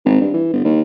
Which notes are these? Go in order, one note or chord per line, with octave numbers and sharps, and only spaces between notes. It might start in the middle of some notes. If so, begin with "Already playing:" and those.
G#1
G2
E3
G1
D#2